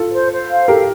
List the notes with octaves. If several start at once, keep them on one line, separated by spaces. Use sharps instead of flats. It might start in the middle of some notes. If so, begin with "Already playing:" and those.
Already playing: F4 A4
C5
C5
F5
G4 A4 A#4